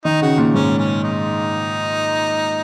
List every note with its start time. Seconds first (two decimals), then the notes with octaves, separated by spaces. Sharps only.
0.04 D#3 D#4
0.21 C#3 F#4
0.38 A#2
0.54 G#2 C#4
0.78 C#4
1.04 D#4